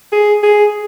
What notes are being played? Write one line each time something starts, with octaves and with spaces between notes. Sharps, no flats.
G#4
G#4